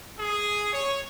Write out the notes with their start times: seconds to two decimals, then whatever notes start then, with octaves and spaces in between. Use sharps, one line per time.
0.19 G#4
0.73 C#5